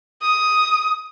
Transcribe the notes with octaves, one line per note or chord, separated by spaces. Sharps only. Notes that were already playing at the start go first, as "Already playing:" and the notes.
D#6